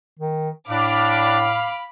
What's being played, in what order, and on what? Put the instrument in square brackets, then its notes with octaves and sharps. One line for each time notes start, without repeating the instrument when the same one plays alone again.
[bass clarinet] D#3
[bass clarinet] A2 [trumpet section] D4 [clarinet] F5 [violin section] B5 D6 F6